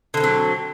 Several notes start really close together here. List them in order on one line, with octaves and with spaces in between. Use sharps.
D3 A#3 C4 F#3